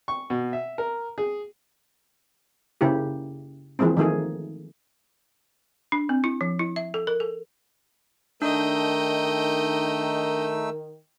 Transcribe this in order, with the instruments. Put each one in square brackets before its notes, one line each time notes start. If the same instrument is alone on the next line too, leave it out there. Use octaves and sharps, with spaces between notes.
[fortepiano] C#6
B2
E5
A#4
G#4
[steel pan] C#3 A#3 E4 G4
E3 F3 G#3 A#3 C4
D#3 F3 A3 A#3 G#4
[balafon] D4
C4
E4
F3
E4
E5
A4
A#4
A4
[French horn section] D#3 A#4 [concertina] A3 D#4 E6 [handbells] D4 [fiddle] D#5 G5